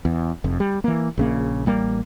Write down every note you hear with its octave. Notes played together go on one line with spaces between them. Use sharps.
E2
F1 F2
G3
E3 A#3
A#1 C#3 A#3
A1 G3 A#3